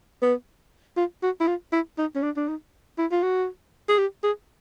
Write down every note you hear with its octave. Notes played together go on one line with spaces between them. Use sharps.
B3
F4
F#4
E4
F4
E4
D#4
C#4
D4
D4
D#4
E4
F4
F#4
G#4
G4
G#4